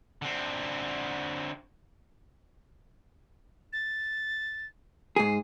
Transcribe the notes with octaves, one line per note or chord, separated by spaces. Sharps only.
D3 C4
A6
G#2 G#4 C7